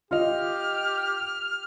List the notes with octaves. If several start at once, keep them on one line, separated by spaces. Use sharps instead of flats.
F4 G4 D#5 F6